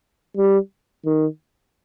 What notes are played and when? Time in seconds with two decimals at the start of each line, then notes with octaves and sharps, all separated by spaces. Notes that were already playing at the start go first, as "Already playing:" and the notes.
0.37 G3
1.05 D#3